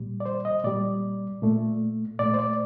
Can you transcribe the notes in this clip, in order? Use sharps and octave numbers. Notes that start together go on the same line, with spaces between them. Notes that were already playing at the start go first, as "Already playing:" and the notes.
Already playing: A#2 G3
D5
C5
D#5
A#2 G3 D5
A#2 A3
A#2 A3 D5
C5
D5